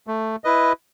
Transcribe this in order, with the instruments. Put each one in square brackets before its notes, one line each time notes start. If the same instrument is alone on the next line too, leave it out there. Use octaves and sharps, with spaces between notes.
[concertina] A3
E4 B4 D#5